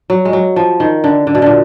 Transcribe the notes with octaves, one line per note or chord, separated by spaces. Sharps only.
F#3
G#3
F#3
F3
D#3
D3
D3
B2
A#2 D3